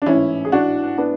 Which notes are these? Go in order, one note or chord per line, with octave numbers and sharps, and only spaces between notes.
D4
A1 G#2 E3 C#4 E4
G#4
D4 F#4
B3 D4